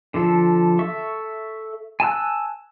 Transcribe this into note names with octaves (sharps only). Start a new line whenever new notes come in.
D3 F3 A4
A4 E5 C#6
G#5 A5 E6 F#6